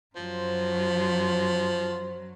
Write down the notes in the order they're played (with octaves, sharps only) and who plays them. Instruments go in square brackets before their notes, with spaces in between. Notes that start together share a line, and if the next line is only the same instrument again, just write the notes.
[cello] F#2 F#3 [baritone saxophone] F3 [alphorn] C5